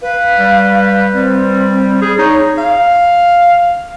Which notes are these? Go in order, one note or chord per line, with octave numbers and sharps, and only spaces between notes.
B4 F5
G3
G3 C4
G#4
D#4 C#5
F5